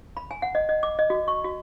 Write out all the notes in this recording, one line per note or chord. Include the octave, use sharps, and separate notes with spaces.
B5
G#5
F#5
D#5
D#5
D6
D#5
F#4
C#6
F#4